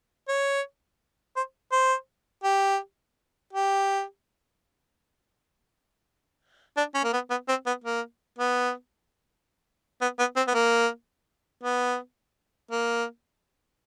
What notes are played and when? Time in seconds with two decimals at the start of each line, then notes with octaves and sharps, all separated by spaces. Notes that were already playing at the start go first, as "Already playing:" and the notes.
0.28 C#5
1.36 C5
1.72 C5
2.44 G4
3.53 G4
6.77 D4
6.94 C#4
7.04 A#3
7.13 B3
7.30 B3
7.49 C4
7.67 B3
7.84 A#3
8.39 B3
10.01 B3
10.19 B3
10.36 C4
10.48 B3
10.54 A#3
11.63 B3
12.71 A#3